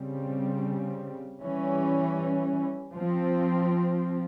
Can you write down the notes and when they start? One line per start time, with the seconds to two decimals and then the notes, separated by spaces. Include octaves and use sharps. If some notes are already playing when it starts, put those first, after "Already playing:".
Already playing: C#3 G3 C4
1.43 E3 G3 C#4
2.94 F3 C4